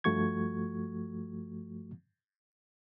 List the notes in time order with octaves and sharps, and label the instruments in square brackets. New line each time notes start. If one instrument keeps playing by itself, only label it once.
[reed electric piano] G2 F3 A3 F#4 C#6 G#6